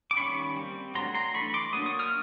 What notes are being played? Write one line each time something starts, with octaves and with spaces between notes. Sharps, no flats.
D6
D#3 G3 A#3 C#4 B5 C#6
G3 C4
F#3 A3 D4 A#5 C6
A#5 C6
E3 A3 D4 B5 C#6
C6 D6
F#3 A#3 D4 D#6
C#6 D#6
D#6 F6